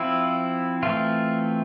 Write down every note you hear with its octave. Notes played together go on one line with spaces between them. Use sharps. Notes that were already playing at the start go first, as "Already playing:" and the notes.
Already playing: F3 C4 E4
E3 A3 C4 F4